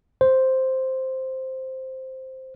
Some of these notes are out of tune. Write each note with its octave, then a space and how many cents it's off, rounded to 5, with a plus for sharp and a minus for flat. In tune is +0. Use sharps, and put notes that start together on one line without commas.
C5 +0